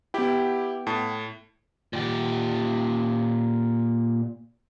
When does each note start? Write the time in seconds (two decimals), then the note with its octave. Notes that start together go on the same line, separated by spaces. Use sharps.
0.14 B3 E4 G4 G5
0.87 A2 A5
1.93 A#2 G4